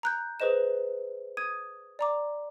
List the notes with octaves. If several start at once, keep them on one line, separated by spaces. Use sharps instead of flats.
A#5 F#6 G6
G#4 B4 C5 D#5 E7
D#6 G#6 D#7
D5 A#5 D6